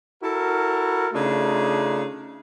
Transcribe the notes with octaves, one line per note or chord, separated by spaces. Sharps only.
E4 F#4 A4 A#4
C#3 A3 D4 D#4 F4